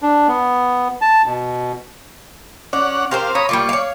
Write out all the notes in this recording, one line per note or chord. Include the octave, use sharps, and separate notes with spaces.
D4
B3
A5
B2
C#4 D5 F#5
C4 G4 A#4 C5 F5
C#5 A#5 B5 D#6
G3 A#3 F4 D5 C#6
C#5 F5